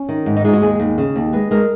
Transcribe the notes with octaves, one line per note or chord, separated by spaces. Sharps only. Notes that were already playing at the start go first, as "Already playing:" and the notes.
Already playing: C#4
D#3
G#2
D#4
G#3 F4
F#4
D#2 G#4
D#2
C#3
D#2
G#3 B4
G#3 A#4